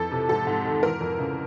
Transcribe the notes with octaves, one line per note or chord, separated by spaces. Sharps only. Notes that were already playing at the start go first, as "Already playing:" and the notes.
Already playing: F2 E3 A4
C3
G#2 A4
G#2
D#3
E3 A#4
F2
C#3